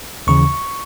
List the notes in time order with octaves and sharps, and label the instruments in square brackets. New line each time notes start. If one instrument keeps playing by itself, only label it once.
[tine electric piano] D#2 C#3 E3 C#6